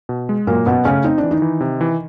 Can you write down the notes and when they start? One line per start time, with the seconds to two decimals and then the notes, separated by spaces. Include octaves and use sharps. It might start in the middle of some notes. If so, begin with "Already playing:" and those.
0.09 B2
0.29 G#3
0.47 A#2 F#3 A#3
0.66 F#2 B2 B3
0.85 C#3 A3 C#4
1.04 C4 D#4
1.18 D4
1.23 E3
1.31 D#3 D#4
1.42 E3
1.60 C3
1.81 E3